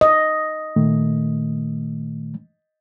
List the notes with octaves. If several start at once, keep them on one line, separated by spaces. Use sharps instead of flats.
D#5
A#2 D#3 A3